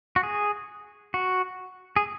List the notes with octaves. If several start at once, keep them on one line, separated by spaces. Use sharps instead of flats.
F#4
G#4
F#4
G#4